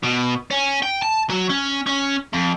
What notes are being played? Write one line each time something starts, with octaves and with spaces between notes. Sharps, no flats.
B2
C#4
G5
A5
F#3
C#4
C#4
F2